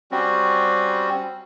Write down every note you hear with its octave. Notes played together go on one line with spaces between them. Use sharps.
G3 C4 C#4 F#4